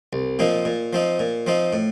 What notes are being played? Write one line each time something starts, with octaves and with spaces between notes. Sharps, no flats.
C2
A#2 F3 C4 D#4
A#2
F3 C4 D#4
A#2
F3 C4 D#4
A2